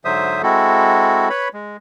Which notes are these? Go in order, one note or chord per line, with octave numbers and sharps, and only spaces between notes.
G#2 D3 F#3 C5 E5 D#6
G#3 C4 E4 F#4 A4
B4 C#5 B5
G#3